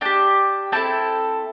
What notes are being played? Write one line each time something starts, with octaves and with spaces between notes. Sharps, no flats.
D4 G4 G5 A5
C4 E4 A4 G5 A5